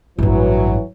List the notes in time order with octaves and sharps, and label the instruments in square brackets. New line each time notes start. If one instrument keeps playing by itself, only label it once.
[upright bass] A1 G2 [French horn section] E3 F#3